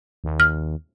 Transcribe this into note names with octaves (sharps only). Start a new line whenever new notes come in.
D#2
F6